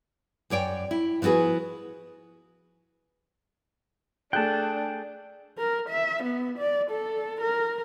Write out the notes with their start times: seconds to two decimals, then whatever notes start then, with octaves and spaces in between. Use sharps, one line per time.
0.50 F#2 C#5 D5 G5
0.91 E4
1.22 F3 B3 E4 F#4 G#4
4.33 A3 D4 G#4 G5 A5 F#6
5.58 A#4
5.89 E5
6.23 B3
6.58 D5
6.90 A4
7.40 A#4